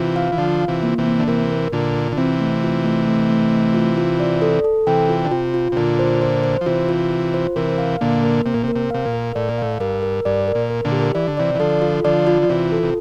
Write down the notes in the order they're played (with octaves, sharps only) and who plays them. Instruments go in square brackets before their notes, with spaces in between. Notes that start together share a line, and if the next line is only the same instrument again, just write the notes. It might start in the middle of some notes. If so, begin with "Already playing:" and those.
Already playing: [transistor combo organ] C3 E3 [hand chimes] F4
[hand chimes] F5
[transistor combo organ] E3
[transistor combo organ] D3 F3 [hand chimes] F4
[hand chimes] F4
[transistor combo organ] C3 E3
[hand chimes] A#3
[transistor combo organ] C3 E3
[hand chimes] A#3
[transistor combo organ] D3
[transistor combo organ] C3 E3 [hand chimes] A#4
[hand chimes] A#4
[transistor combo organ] A#2 D3 [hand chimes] F4
[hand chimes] F4
[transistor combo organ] D3
[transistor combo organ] C3 E3 [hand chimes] C4
[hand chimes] A3
F4
A3
A3
A3
A3
F4
F4
D5
A4
A4
[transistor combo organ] C3 E3 [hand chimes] G5
[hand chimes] F4
[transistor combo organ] D3
[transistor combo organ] C3 [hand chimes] F4
[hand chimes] F4
[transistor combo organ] C3
[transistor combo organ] A#2 D3 [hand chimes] F4
[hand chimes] C5
C5
C5
[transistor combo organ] F3
[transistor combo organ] C3 E3 [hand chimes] F4
[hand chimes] F4
F4
C5
[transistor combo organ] C3 E3 [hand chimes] A#4
[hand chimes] F5
[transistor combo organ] A#2 D3 [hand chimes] A#3
[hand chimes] A#4
[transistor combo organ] C3 [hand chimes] A#3
[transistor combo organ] A#2
C3
[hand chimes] A#4
[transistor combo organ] C3
[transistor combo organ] C3 [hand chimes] F5
[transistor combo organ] A#2
[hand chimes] A#4
[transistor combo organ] A2 [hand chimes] D5
[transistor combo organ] A#2
[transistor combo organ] A2 [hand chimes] F5
[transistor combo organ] G2 [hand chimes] A#4
[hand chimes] A#4
[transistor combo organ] G2 [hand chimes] D5
[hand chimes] A#4
[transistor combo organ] A#2
[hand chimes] A#4
[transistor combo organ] A#2 D3
[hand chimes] G4
[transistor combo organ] E3 [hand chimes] D5
[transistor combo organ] D3
[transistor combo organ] C3 E3 [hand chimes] D5
[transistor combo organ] E3
[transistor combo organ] D3 F3 [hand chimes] A4
[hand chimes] F4
[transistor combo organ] D3 F3 [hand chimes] D5
[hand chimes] F4
[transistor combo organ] F3
[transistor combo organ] C3 E3 [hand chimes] F4
[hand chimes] A4
[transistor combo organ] C3